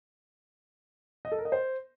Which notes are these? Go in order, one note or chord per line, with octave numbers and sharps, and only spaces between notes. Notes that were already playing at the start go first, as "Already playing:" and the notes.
D#5
A4
A#4
D#5
C5